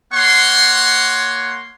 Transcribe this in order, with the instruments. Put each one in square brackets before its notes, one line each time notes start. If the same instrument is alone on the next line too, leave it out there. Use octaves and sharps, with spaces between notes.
[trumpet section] A#3 C#5 F#5 C6